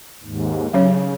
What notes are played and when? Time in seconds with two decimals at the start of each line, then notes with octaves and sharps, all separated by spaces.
0.23 D#2 G#2
0.73 C#3 F#3 C#4 C#5